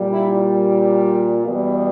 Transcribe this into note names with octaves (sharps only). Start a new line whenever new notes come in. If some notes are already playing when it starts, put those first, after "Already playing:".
Already playing: A#2 G3
E4
E2 B2 G3